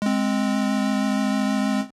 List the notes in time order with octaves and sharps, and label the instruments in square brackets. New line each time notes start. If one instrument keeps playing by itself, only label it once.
[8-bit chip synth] G#3 C4